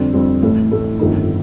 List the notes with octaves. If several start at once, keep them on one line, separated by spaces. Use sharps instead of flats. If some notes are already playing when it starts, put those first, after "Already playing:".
Already playing: F2 D3 G3 C4
F2 D3 G3 C4 G4
A1 A2 A3
A1 A2 A3
G1 F2 D#3 A3 D#4